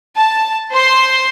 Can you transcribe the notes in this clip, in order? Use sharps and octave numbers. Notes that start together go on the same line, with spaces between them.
A5
C5 C6